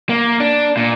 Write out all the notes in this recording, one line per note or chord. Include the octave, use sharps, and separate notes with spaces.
A#3
D4
A#2